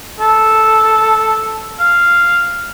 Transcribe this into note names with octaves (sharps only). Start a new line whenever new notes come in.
A4
F5